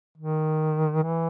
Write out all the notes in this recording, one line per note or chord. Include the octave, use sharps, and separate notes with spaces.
D#3
E3